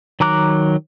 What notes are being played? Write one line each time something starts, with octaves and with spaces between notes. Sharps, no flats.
D#3 F#3 A#5 D6 F#6